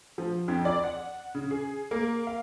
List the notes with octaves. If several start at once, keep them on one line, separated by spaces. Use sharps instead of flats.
F3
F2
D5
F#5
C#3
G#4
A#3
F5